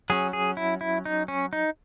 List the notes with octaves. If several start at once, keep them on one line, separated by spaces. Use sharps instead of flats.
F#3 C#4 G#4
G#4
E4
E4
D#4
C#4
D#4